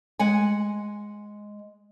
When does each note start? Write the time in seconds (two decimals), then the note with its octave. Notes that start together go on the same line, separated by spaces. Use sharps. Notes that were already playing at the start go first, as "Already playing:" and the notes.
0.19 G#3 F#5 G#5